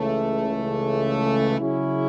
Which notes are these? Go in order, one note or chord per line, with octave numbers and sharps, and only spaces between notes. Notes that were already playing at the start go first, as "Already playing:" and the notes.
Already playing: C#2 C#3 E3 A3
C#3 F#3 C#4 E4